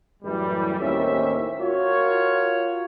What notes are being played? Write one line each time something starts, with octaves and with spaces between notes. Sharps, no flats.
F#2 A2 E3 F#3 G3
D#2 A2 A#3 C4 C#4 E5
F4 F#4 A#4 C#5